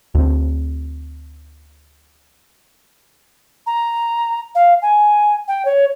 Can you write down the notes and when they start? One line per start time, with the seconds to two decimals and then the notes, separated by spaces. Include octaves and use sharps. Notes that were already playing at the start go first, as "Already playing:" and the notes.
0.15 D2 C4
3.66 A#5
4.55 F5
4.82 G#5
5.48 G5
5.65 C#5